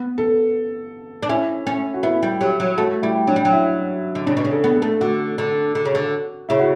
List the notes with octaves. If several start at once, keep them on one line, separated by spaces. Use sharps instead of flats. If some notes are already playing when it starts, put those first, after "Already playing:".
Already playing: B3
A4
D4
C#4 E4
C#4
F#4
B3 E4
G3
F#3 G4
F#3
A3 F#4
G3 E4
F#3 D4
G3
F#3
E4
D3
C#3 D4
B2
C#3
A4
B3
A4
A3
D3 F#4
D3
D3
C#3
D3
C#3 E4
F#4